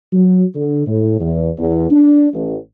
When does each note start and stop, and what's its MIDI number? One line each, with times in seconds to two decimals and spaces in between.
0.13 0.45 54
0.55 0.83 50
0.87 1.18 45
1.19 1.50 40
1.59 1.88 40
1.91 2.29 62
2.34 2.57 33